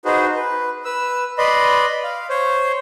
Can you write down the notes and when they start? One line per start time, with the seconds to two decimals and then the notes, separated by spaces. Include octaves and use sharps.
0.05 D#4 F#4 G#4 B4 C5
0.36 B4
0.85 B4 E6
1.38 B4 D5 D#5 B5 C6
2.03 F5
2.29 C5 C#5